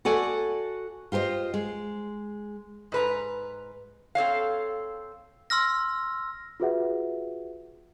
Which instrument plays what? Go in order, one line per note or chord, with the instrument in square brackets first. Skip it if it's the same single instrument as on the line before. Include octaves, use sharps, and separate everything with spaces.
[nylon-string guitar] F#4 A4 D5 G#5
F4 G4 A#4 C5 D#5
G#3
[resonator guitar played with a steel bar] G#2 B4 A#5
C4 A4 C#5 F5
[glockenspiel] C6 E6 F6 A#6
[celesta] F4 F#4 G#4 B4 E5 F#5